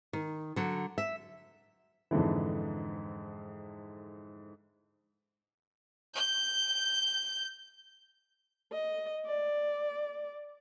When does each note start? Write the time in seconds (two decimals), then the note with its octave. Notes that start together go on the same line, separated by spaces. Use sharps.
0.13 D#3
0.56 D3 F#3
0.98 E5
2.11 F2 G#2 D3 E3
6.16 G6
8.73 D#5
9.27 D5